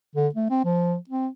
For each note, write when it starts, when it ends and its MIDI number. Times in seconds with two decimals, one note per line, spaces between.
0.15 0.28 50
0.34 0.50 57
0.50 0.63 60
0.65 0.96 53
1.09 1.28 60